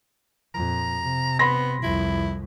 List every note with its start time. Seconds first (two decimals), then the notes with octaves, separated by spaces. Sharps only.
0.54 F2 A#2 A#5
1.01 C3
1.39 B3 B5 C6 A#6
1.83 C2 F2 E4